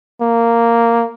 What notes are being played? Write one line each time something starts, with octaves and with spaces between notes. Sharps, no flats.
A#3